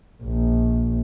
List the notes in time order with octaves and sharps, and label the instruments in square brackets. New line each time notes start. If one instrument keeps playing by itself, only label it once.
[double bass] A#1